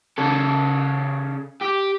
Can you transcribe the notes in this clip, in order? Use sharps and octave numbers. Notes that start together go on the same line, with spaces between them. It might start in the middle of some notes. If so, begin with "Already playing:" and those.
C#3 A4
G4